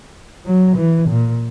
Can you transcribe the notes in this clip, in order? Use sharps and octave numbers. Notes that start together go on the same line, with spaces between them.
F#3
E3
A#2